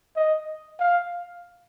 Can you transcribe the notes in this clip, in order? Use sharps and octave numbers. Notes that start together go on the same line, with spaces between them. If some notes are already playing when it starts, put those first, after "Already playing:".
D#5
F5